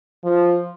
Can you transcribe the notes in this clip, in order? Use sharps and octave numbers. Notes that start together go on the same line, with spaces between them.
F3